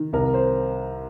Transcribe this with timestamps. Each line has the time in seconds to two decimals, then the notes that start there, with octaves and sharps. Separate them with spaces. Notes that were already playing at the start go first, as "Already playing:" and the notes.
Already playing: D#3
0.13 C2 A#4
0.34 C5